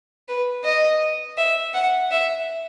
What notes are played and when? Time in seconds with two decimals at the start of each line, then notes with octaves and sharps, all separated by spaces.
0.28 B4
0.64 D#5
1.37 E5
1.74 F#5
2.11 E5